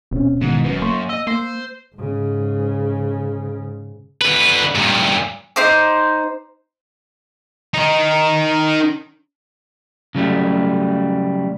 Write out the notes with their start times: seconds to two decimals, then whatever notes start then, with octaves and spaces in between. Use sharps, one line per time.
0.11 D#1 B2 C4 C#4
0.41 G#2 B2 D#3 E3
0.64 F#2 C#3 B4
0.82 A#3 C6 C#6
1.09 D#5 E6
1.27 A#3 C5
1.95 G#2 C#3
4.22 D3 B4
4.75 G2 A#2
5.56 D#4 C5 D6
7.74 D#4 A#4
10.15 C#3 F#3 G3 A3